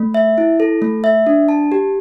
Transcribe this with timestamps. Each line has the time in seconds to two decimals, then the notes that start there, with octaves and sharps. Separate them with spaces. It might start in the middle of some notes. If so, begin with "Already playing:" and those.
Already playing: A3
0.14 E5
0.38 E4
0.60 A4
0.82 A3
1.04 E5
1.27 D4
1.49 A5
1.72 G4